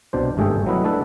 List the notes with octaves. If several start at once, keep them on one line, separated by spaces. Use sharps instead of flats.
C2 B2 D4 C5
G#1 G2 A3 G#4 A4 G5
F#3 B3 E4 B4 D#5
A3 D4 E4 A4 B4